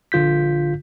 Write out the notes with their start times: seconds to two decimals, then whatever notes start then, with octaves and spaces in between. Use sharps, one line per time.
0.12 A#1 D3 F4 G6 B6